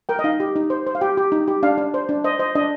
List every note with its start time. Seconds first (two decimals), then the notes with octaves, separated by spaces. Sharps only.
0.09 A#4 G5
0.19 D#5
0.24 D#4 F5
0.40 G4
0.56 D#4
0.70 C5
0.87 C5
0.95 F5
1.01 G4 G5
1.17 G4
1.32 D#4
1.48 G4
1.63 D4 F5
1.78 D4
1.94 C5
2.09 D4
2.24 C5 D#5
2.39 C5 D#5
2.55 D4 D#5